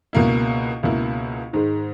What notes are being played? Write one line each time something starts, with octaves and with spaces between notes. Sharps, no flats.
C#2 B2 A#3 E4
C#2 B2 A#3 E4
G#2 D#3 G#3